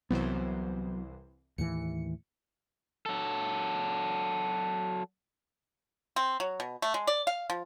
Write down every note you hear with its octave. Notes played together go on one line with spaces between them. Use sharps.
C2 E3 F#3 B3 C5
D#2 A2 E3 C#7
F#3 A4
C4
F#3
B2
A3
G#3
D5
F5
F3